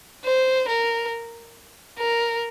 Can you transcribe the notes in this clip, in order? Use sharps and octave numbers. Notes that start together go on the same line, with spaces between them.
C5
A#4
A#4